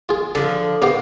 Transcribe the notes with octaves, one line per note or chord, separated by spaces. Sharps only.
F4 G#4
D3 F3 A4
C3 A#3 B3 G4